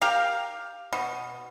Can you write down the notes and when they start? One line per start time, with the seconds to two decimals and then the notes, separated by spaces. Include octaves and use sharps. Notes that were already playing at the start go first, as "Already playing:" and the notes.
0.02 G4 A#4 F5
0.93 B2